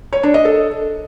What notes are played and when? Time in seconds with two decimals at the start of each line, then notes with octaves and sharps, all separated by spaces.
0.13 C#5
0.23 D4
0.34 D#5
0.45 A4